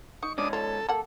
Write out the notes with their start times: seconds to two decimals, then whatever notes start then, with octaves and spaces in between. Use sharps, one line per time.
0.23 D#4 C#6
0.38 G#2 C#4 D4 D#6
0.53 F4 A4 C#5
0.89 A#3 A4 F#5